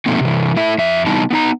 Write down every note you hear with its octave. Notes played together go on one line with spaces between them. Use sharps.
B2 F3 A3 A#3 C4 D#4
C3 E3
A3 E4 E5
F2 E5
C3 E3 G3 B3 D#4 A5
B3 D#4 A#5